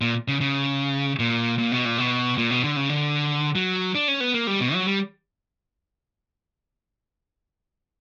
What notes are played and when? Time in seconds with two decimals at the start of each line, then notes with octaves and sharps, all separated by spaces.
0.01 A#2
0.28 C#3
0.41 C#3
1.19 A#2
1.58 A#2
1.72 B2
1.85 A#2
1.98 B2
2.38 A#2
2.51 B2
2.64 D3
2.76 C#3
2.89 D3
3.55 F#3
3.95 D4
4.08 C#4
4.20 B3
4.34 A#3
4.47 G3
4.61 B2
4.74 F#3
4.87 G3